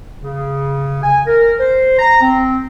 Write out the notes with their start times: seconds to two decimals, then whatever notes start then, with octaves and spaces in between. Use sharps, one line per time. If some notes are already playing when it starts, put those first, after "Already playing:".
0.23 C#3
1.03 G#5
1.27 A#4
1.60 C5
1.98 A#5
2.21 C4